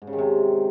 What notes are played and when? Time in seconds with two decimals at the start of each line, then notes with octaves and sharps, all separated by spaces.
0.02 G#2
0.07 C#3
0.13 D#3
0.18 C3